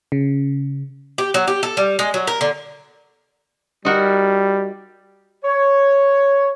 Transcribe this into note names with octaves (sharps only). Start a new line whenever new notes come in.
C#3
G4
F#3
G4
A4
G3
G#3
F#3
A#4
D3
G3 D#4 F#4 A#4
C#5